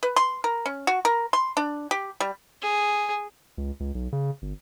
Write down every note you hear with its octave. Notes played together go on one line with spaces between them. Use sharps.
B4
C6
A#4
C#4
F#4
A#4
C6
D4
G4
G3
G#4
C#2
C#2
B1
C#3
G1